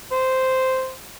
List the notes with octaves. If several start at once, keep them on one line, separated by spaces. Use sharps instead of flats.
C5